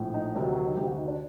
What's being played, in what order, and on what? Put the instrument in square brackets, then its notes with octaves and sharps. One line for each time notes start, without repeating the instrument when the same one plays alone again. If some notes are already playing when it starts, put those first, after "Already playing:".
Already playing: [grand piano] A#1 A2
D#4
D2 C3 D#3 D#4
F#3
F#3
D#4
D2 C3 D#3 G4
F#4
D#4
D4